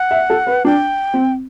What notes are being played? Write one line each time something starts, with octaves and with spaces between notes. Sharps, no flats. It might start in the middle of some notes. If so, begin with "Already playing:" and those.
Already playing: F#5
E5
A4
B4
D4 G5
C4